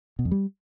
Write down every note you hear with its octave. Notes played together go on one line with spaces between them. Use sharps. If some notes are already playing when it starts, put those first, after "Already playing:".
B2
F2
G3